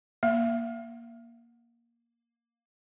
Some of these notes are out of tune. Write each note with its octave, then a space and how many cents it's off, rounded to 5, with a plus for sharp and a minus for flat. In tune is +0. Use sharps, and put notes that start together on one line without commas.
A#3 +10 E5 +35